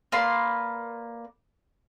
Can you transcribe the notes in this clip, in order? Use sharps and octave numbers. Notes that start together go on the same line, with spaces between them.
A#3 B4 D5 C6